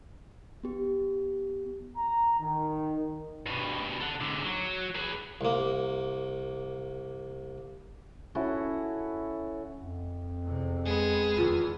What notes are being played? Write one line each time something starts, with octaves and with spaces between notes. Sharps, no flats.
B3 G4
A#5
D#3
G2 B2
A4 F#5
G#2 D3
F#3
G#4 B4
C2 A#3
C#4 E4 F#4 A4
F2
E2 C3
G#3 B3 G#4
E2 D#3 F4